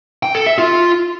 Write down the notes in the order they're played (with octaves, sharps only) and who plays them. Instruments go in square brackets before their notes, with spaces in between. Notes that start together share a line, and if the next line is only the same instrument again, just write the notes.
[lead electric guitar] G5
A4
E5
F4